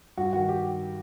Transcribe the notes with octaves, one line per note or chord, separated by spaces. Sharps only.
G2 F#4
D#3 F#4
G4